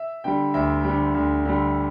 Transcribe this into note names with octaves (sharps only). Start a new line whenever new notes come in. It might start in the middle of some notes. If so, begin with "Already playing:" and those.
Already playing: E5
D3 G3 G5
D2 E5
D3 G3
D2
D3 G3